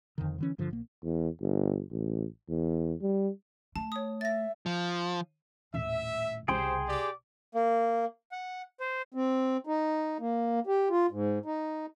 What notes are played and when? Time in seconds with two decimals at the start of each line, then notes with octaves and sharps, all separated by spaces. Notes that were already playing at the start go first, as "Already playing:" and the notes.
0.18 F2 D3 D#3
0.38 D3 E3 C#4
0.58 G2 D3 F3
0.71 A#1 A#3
1.03 E2
1.41 G1
1.91 A1
2.49 E2
3.02 G3
3.76 A3 A5
3.92 C#5 D#6
4.21 E5 A6 A#6
4.66 F3
5.74 D#1 A2 E5
6.48 C2 C#3 G4 G#4 C5 G5 C6
6.88 G4 D5 D6
7.55 A#3
8.32 F#5
8.80 C5
9.14 C4
9.67 D#4
10.20 A#3
10.67 G4
10.90 F4
11.11 G#2
11.46 D#4